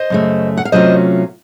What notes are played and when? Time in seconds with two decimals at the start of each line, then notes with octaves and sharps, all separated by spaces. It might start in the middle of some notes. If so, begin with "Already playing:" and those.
Already playing: C5 D#5
0.10 F#2 C#3 A3
0.57 F#5
0.65 F5
0.72 C3 F#3 A3 C#4 F4 C5 D#5